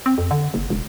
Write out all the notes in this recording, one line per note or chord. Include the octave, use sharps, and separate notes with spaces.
C4
F2
D3
F#1
E1